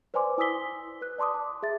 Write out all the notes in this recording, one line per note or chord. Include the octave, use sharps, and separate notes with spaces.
B4 C5 D5 G#5 C6 D6
E4 G#5 D#6 E6 B6 G7
B4 F#6
D5 A5 C6 D6 D#6
A5
G#4 E5 A6